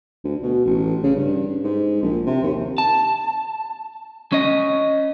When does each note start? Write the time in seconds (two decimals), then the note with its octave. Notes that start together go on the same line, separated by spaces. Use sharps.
0.24 D2
0.42 B2
0.65 A1
1.03 C#3
1.16 G2
1.64 G#2
2.02 A#1
2.26 C3
2.43 D#2
2.78 A5
4.32 C#4 D#5